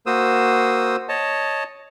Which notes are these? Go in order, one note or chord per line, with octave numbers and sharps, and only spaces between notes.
A#3 F#4 C5 D#6 E6
C#5 D#5 A5